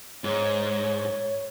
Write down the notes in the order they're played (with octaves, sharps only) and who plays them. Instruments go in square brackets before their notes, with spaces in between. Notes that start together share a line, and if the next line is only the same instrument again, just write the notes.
[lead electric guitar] G#2 [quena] C#5